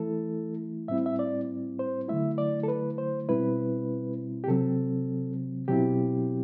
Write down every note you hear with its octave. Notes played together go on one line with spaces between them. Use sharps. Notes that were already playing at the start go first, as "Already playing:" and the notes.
Already playing: E3 A3 E4 A4
A2 G3 C4 E4 E5
E5
D5
C5
D3 F#3 A3 E4 E5
D5
A4
B4
C5
B2 G3 C4 E4 B4
G4
C3 F#3 C4 A4
B2 F#3 C4 E4 G4